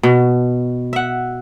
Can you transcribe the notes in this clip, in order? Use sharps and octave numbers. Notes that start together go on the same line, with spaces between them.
B2
E5 F#5